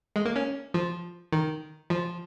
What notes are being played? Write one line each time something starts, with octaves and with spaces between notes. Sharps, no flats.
G#3
A#3
C#4
F3
D#3
F3